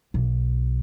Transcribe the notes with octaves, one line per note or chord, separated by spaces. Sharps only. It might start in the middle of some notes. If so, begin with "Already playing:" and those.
B1